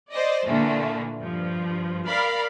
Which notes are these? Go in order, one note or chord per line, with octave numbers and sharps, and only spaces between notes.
C5 D5 D#5
A#2 D3 E3 A3 A#3
G2 F3
A#4 D5 F5 B5 F6